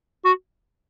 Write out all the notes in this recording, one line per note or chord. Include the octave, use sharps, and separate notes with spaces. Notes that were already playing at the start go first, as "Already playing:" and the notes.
F#4